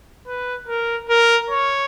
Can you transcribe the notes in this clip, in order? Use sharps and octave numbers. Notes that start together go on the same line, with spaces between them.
B4
A#4
A#4
C#5